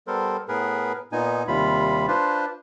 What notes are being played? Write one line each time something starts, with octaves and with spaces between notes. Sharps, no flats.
G3 B3 A4 A#4 C5
A2 B3 G#4 A#4 B4
A#2 B3 D#4 G#5
D#2 C3 G3 F4 B5
D4 F4 B4 C5